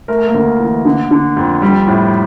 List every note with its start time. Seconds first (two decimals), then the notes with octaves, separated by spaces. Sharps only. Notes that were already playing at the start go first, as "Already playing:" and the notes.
0.08 A3 A#4
0.18 A4
0.28 A#3 A#4
0.34 D2
0.60 E3
0.85 D3
1.11 D3
1.37 F2
1.62 G3
1.87 A2